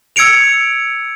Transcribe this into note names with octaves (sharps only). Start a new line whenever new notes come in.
E6 G#6 C#7 D7 F7